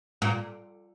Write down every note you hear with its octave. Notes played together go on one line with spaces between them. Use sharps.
A#2